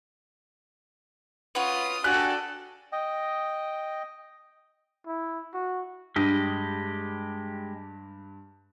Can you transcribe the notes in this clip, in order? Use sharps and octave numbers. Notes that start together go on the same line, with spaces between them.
C#4 F4 F#4 B4 D#6
D4 F#4 G4 A4 D5 G#5 F#6
D#5 G5
E4
F#4
G2 G#3 G4 D#5